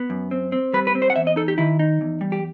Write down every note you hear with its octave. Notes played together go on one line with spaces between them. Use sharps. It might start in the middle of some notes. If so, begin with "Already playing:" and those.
Already playing: B3
F#2
C4
C4
G3 B4
B4
C4
C5
F#5
E2 E5
D#5
D#4 A4
G4
D#3 E4
D#4
E2
G3
G4